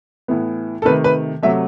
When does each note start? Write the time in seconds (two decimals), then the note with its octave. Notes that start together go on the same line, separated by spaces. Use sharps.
0.28 A2 E3 B3
0.82 A4
0.85 C3 D#3 A3 B4
1.04 B4
1.43 C3 F#3 A3 E5